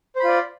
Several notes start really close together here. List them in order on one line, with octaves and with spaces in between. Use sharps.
C5 B5 F4 D5